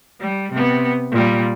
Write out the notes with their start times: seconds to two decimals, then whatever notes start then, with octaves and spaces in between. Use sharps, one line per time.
0.20 G3
0.52 C3 B3
1.12 A#2 G3